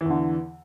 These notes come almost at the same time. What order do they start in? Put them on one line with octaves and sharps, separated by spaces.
E3 E2 D3